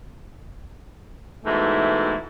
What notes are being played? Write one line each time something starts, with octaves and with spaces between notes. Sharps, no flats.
G#2 B2 E3 A3 E4